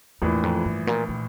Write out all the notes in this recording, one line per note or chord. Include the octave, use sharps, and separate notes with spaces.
A#1 E2 A2 E3
F2
G2
A#2
A#2